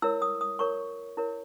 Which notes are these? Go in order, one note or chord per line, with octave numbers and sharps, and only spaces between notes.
E4 A#4 C#5 E6
D#6
D#6
E4 A#4 C#5 C#6
E4 A#4 C#5